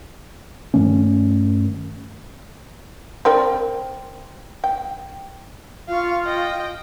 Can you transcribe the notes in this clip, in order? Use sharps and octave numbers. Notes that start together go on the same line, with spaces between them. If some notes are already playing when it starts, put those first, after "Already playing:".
G2 D#3 A3 C#4
C4 A#4 D5
G5
F4 F5 C#6
D#5 G5